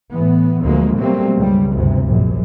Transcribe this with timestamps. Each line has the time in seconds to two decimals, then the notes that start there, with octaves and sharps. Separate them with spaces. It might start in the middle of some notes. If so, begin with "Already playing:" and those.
0.10 A2 E3 B3
0.63 D2 D3 F3 F#3 G#3 A#3
0.97 B2 F#3 G3 A3 A#3 C4
1.37 C#2 G2 G3
1.74 G1 D2 G2 C3
2.06 A#1 F#2